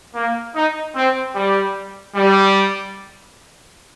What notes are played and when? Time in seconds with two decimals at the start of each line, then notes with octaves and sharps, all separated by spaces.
0.15 A#3
0.56 D#4
0.96 C4
1.36 G3
2.16 G3